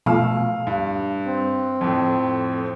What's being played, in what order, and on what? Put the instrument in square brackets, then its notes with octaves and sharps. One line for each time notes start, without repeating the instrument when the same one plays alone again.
[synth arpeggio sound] B2 F3 A3 [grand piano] F5 E6
[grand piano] G2
[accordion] C4
[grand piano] F2 A2